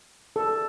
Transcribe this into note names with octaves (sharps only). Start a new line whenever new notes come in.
A4